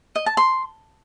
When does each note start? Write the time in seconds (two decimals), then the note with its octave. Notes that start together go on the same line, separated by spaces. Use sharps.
0.16 D#5
0.26 A5
0.37 C6